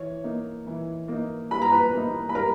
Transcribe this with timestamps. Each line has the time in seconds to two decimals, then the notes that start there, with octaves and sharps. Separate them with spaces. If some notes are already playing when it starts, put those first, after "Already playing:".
Already playing: E3 C#5
0.24 A#3 D#4
0.66 E3
1.08 A#3 D#4
1.51 G3 B5
1.62 A#5
1.72 B4 B5
1.93 A#3 D#4
2.29 B5
2.35 G3 A#4 A#5